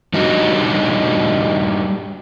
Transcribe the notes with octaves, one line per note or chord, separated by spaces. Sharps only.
G3 D4 D#4 F#4 G4